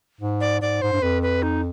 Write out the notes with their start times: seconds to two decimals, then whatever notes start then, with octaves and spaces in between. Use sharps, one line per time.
0.21 G#2
0.41 D5
0.61 G#2 D5
0.82 G#2 C5
0.92 G2
1.02 F2 B4
1.22 B4
1.43 D#4